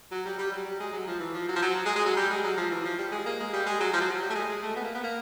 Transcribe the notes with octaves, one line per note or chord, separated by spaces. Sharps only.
F#3
G3
G3
F#3
G3
G#3
F#3
F3
E3
F3
F#3
F3
F#3
G#3
G#3
F#3
G3
G#3
F#3
F3
E3
F3
G3
G#3
A#3
G#3
G3
G#3
F#3
F3
F#3
F#3
G3
A3
G#3
G#3
A3
B3
A#3
B3
A#3